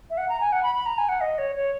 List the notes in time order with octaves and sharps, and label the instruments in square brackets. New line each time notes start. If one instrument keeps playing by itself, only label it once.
[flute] E5
F#5
A#5
G#5
F#5
B5
B5
A#5
G#5
F#5
D#5
C#5
C#5